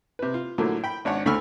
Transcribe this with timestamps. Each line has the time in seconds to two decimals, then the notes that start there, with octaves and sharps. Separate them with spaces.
0.19 C3 B4
0.34 F4
0.58 A2 D3 F3 F#3 A#3
0.84 G5 B5
1.05 G#1 D4 C#5 F#5
1.26 D2 D3 B5 C#6 E6 F6